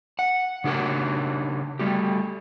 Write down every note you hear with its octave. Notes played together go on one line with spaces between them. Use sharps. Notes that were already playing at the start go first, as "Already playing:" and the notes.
F#5
C#3 D4 G4 A#4 F#5
G3 A3 G4